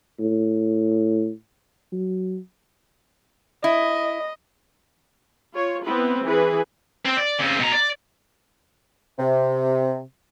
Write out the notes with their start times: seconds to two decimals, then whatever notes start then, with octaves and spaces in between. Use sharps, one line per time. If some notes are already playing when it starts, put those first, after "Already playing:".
0.20 A2
1.92 F#3
3.64 E4 D#5
5.53 F4 C#5
5.83 B3 C4 E4 B4
6.24 E3 G#4 B4
7.05 C4
7.17 D5
7.39 C#3 C4
7.59 B2 A#5
7.72 D5
9.19 C3